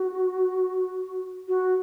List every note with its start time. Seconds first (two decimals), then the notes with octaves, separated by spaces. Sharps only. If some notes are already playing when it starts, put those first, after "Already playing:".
Already playing: F#4
1.48 F#4